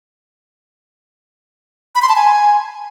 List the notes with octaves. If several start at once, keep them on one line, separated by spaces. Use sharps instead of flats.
B5
C6
A5
G#5